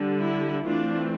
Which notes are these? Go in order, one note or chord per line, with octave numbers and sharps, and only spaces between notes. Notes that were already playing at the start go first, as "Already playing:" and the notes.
Already playing: D3 G3
E4
E3 A3 C4 D4 F4